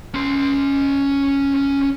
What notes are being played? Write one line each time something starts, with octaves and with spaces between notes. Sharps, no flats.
C#4 C6